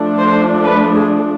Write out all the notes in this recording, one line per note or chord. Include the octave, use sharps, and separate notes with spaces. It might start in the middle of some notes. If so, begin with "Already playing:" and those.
Already playing: F3 A3 D4
C5
B4
G#4